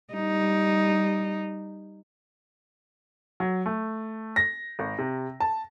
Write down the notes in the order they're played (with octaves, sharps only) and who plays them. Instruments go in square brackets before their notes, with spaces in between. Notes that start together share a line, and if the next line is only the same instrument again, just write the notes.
[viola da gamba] G3 D#4
[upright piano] F#3
A3
A#6
G#1
C3
A5